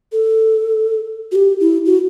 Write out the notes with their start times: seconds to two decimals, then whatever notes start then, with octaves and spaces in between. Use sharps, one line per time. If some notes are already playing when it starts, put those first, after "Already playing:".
0.12 A4
1.32 F#4
1.35 G4
1.60 E4
1.86 F#4